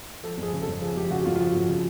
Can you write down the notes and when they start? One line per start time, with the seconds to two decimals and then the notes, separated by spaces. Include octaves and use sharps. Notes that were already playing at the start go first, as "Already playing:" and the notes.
0.23 F3 A4
0.37 F2
0.43 G#4
0.53 C#3
0.62 A4
0.67 F2
0.81 F3 G#4
0.96 F2 G4
1.10 C#3 F#4
1.25 F2 F4
1.36 F4
1.40 F3 F#4
1.55 F2
1.69 C#3